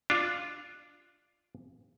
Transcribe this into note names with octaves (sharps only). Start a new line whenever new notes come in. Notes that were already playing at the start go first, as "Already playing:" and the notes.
D4 F4